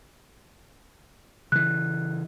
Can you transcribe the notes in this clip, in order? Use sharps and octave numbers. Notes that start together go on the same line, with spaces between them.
C#3 E3 F#6